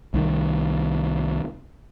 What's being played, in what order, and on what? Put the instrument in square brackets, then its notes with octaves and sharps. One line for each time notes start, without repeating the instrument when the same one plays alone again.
[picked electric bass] C2 D#3